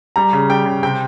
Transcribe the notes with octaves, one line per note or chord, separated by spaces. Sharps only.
G3 A#5
C#3
G3 G5
C#3
C3 G5